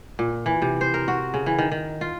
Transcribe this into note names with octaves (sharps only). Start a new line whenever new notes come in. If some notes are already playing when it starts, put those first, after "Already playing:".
A#2
E3
C3
C5
A#4
F#4
C#3
E3
D#3
D#3
F4